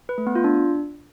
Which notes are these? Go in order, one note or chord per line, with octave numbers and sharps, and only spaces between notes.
B4
A3
B3
F4
D4